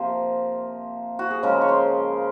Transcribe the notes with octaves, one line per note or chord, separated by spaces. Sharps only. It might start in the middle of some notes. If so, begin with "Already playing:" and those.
Already playing: C3 F3 A#3 A#4 C5
F#4
G#4
C#3 F3 G#3 A#4
C#5
C5